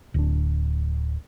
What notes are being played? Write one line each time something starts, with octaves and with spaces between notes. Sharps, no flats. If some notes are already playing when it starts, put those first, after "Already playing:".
D1 D4